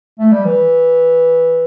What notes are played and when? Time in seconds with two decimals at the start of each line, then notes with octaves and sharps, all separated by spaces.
0.19 A3
0.32 G3
0.45 E3